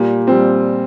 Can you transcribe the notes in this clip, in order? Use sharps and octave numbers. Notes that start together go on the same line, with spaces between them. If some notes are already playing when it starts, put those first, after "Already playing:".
Already playing: A#2 G3
F3 G3 C4